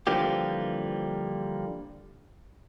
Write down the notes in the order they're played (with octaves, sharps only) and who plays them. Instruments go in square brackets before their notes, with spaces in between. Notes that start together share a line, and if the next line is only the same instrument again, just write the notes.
[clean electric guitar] D3 E3 F3 G3 A#3 G4